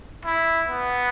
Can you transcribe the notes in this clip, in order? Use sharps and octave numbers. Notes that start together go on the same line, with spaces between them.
E4
B3